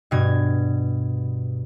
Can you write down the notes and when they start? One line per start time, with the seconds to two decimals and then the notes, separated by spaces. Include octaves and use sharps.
0.11 G2 B2 G#6